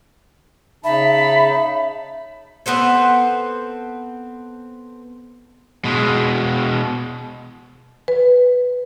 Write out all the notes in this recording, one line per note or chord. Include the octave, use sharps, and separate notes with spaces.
C#3 D#4 E5 A5 B5
B3 C4 A4 C5
B2 G#3
B4